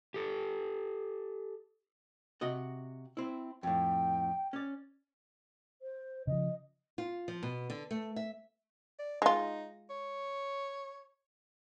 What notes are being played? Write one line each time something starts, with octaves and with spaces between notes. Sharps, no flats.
G4 A4
C3 F#4 D#5
C4 E4
F2 A2 G5
C#4 D5
C5
C#3 F3 D#5
F4
F3
B2
D3
A3
E5
D5
G#3 D#4 F4
C#5